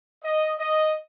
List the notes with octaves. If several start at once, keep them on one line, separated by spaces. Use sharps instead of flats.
D#5
D#5